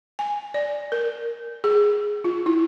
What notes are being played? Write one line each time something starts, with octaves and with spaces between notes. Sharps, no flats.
G#5
D5
A#4
G#4
F4
E4